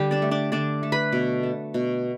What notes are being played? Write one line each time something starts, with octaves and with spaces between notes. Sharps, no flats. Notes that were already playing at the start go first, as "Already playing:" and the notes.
Already playing: D3 G3 G4
D4 D5
A3
D4 D5
D3 D4 D5
A3
B4 B5
B2
A3
B2